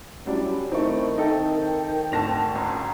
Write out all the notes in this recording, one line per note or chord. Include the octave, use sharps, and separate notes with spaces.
F#3 G3 C#4 D4 E4
D#3 A3 C4 D#4 E4 C#6
D#4 A4 E5 G5
G#1 D2 A5 A#6 F7
C#2 A#5